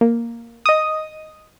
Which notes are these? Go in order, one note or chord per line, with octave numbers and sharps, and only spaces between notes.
A#3
D#5 D#6